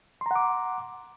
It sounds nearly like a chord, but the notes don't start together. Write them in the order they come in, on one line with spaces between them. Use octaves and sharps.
C6 A#5 F#5 D6